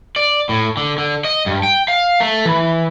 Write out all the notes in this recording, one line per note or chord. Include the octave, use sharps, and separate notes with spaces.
D5
A2
D3
D3
D#5
G2
G5
F5
A3
E3